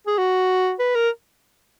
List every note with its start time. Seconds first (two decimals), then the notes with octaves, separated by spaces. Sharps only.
0.07 G#4
0.18 F#4
0.79 B4
0.95 A#4